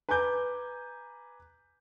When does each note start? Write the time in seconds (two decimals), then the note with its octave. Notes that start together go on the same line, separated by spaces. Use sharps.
0.09 B4 G#5 A#5 D6 G6